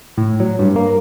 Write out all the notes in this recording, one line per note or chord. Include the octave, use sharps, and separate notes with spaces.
A2
F#3
G2
A#3